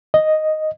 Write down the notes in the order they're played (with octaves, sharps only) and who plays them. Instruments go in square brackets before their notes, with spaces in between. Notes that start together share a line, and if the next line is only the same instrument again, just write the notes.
[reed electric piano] D#5